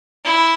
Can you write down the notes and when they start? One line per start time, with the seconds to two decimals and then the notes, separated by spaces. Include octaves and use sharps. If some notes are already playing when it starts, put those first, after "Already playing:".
0.25 E4